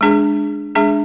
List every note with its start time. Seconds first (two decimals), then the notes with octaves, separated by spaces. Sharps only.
0.01 G#3 D4 G#4
0.75 G#3 D4 G#4